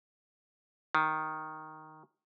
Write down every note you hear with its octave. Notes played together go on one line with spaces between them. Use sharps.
D#3